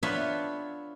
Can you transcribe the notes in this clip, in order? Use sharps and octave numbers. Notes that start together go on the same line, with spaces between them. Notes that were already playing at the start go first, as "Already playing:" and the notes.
B3 D4 F4 B4 C#5 E5